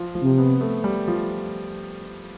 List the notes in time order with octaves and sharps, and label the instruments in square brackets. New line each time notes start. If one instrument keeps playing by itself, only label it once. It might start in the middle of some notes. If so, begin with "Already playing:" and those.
Already playing: [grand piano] F3
F3
[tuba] C3
[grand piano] B3
A3
G3
F3